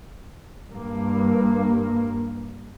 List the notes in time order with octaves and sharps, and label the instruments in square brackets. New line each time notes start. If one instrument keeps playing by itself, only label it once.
[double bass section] G2 A#3